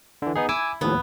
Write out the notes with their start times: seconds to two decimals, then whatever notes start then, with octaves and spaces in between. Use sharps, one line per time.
0.22 D3 E3
0.36 B3 D#4 G#4
0.49 E4 G#5 D6 E6
0.81 D#2 A2 F3 B3